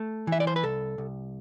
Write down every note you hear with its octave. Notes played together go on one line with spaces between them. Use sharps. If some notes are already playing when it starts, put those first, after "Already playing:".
Already playing: A3
E3
E5
D5
C5
B4
C2 A4
C2